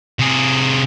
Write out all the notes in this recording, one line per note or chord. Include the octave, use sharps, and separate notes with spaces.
C3 G#4